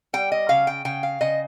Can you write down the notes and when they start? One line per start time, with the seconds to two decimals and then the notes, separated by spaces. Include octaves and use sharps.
0.13 G3 G5
0.32 D#5
0.49 C#3 F5
0.67 G5
0.85 C#3 G5
1.03 F5
1.21 C#3 D#5